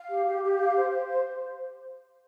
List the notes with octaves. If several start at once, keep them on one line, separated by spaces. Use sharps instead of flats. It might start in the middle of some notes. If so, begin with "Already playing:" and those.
Already playing: F5
G4
G4
G4
F5
C5
C5
C5